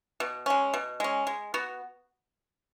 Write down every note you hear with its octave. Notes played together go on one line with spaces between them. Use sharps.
B2
G#3 C#4
B2
G#3 C#4
G#3
B3 F#4